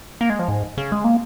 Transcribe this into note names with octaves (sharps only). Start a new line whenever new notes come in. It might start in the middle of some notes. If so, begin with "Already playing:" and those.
A#3
G#3
F3
G#2
C#3
G#3
A#3